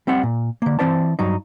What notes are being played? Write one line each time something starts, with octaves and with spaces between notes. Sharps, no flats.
G3 C4 E5 F#5
A#2
D3 A#3
E3 C4 C5 D5 A5
G2 F#3 D#4